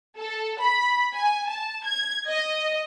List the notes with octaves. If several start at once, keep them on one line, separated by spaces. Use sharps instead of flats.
A4
B5
G#5
A5
G#6
D#5